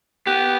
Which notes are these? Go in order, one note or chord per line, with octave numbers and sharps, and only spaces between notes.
B3 G4